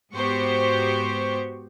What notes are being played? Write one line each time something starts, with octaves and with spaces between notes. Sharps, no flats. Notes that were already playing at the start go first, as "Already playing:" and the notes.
G#2 B3 F#4 G4 C5 C#6